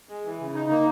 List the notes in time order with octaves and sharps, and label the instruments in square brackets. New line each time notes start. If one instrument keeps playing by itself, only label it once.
[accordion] G#3
E3
C#3
D#4
A#3